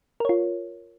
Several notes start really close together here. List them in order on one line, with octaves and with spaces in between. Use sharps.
A#4 C#5 F4